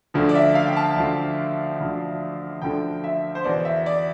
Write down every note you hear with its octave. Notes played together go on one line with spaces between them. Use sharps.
D2 D3 F3
D5
E5
F5
G5
A5
D2 D3 F3
D2 D3 F3
D2 D3 F3 G5
E5
C5
E2 B2 D5
E5
D5